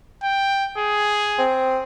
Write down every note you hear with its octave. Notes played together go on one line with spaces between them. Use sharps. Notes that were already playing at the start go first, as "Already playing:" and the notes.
G5
G#4
C4